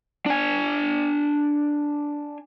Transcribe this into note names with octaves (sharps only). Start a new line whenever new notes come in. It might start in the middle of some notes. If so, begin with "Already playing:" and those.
D4 G#5